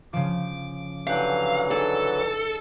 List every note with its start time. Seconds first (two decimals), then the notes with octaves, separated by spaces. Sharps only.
0.13 C#3 F3 D6
1.07 D3 E3 F#3 G4 F5 F#5 G#5
1.71 D#4 G#4 A4 D5